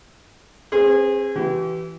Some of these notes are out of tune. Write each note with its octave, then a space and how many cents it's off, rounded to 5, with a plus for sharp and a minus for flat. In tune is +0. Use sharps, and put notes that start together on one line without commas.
C4 +35 G#4 -20 C5 -40
E3 +0 G4 -40